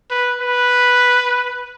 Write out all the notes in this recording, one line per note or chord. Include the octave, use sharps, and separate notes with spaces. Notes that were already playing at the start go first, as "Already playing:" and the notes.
B4
B4